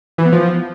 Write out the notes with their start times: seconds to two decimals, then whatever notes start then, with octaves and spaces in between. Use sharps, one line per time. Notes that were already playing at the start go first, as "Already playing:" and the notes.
0.18 E3
0.25 B3
0.33 F3